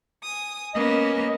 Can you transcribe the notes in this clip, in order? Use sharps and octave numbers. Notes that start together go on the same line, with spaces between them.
G#5 D#6
A#3 B3 C#4 D#5